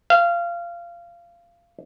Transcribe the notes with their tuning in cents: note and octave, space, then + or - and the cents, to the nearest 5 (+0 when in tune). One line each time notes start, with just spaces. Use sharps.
F5 -20